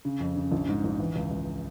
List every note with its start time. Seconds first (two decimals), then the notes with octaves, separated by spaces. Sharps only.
0.05 C#3
0.20 F2
0.36 C#3
0.52 A#1
0.69 G#2
0.84 A#1
1.00 E3
1.15 C#2
1.31 C#2